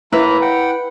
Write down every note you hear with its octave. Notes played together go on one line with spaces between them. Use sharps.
A2 A#3 E4 B4 A#5
F#5 G5